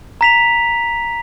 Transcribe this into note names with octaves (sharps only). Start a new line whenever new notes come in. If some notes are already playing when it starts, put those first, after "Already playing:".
A#5 B6 F7